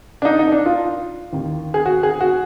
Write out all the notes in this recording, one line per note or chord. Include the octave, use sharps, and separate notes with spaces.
D4
D#4
D#4
D4
F4
D#2 D#3
G#4
F#4
G#4
F#4